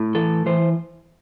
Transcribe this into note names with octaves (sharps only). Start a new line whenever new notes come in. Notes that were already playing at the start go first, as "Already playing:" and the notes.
Already playing: A2
E3 A4
E3 C5